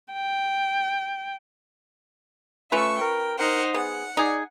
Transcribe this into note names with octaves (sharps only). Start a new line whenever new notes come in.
G5
A3 C#4 F4 B4 E5 C#6
A#4 G5
D#4 A#4 C5 F#5
B3 G#4 F#5
D#4 G#4 D5